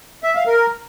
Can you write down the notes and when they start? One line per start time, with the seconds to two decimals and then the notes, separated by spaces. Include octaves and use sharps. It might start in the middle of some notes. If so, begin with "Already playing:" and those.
0.23 E5
0.35 F5
0.47 A#4